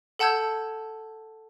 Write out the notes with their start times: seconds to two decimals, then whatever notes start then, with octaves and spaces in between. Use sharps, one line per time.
0.19 A4 F#5 A5 E6 G6 G#6